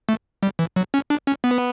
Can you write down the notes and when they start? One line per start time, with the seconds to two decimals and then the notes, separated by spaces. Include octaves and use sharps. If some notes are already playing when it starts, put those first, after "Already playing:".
0.09 A3
0.43 G3
0.59 E3
0.76 F#3
0.94 C#4
1.10 D4
1.27 C#4
1.44 B3